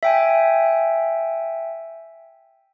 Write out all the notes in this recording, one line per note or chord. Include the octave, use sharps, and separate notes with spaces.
E5 G5 G#5